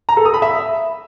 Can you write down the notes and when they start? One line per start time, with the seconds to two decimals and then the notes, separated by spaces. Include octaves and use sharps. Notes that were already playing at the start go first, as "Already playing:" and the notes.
0.09 A#5
0.17 A4
0.25 D#6
0.34 B5
0.42 E5